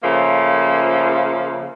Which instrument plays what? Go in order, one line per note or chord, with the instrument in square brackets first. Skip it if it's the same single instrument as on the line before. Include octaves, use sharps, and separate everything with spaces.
[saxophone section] C#3 F3 A3 A#3